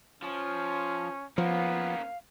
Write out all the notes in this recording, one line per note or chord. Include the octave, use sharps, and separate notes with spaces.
F3 C#4
F3 A#3 B3 C#4 F5